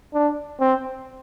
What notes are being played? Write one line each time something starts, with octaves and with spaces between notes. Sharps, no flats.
D4
C4